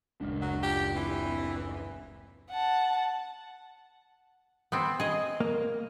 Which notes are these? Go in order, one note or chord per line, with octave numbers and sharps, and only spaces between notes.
F#1 D2 A#2 C#3 G#3 D4
F#3
F4 G4
E3 C4
F#5 A5
B3 C4
G#4 D#5
A#3